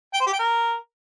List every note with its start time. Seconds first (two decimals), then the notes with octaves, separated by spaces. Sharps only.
0.14 G5
0.20 C5
0.26 G4
0.33 G5
0.39 A#4